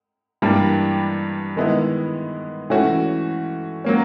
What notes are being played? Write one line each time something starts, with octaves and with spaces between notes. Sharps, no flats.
G2 E3 G3 A#3 D4
D#3 G#3 B3 E4
E3 A3 C#4 F#4
F#3 A#3 C#4